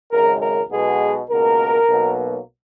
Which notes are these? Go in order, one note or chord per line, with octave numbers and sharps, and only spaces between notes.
G#1 F#2 C#3 G#3 A#4
A#4
B1 B2 G#3 B3 G#4
C#2 B2 A#3 A#4
B1 B2 F#3 A#3